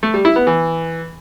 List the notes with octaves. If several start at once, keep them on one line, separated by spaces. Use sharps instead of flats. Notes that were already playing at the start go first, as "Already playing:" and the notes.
A3
G3
E4
B3
E3